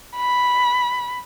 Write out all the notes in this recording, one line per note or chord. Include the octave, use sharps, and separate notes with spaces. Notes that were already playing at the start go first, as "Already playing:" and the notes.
B5